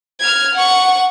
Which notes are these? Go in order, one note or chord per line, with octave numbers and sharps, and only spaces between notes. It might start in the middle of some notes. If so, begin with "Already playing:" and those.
F6 G#6
F#5 C#6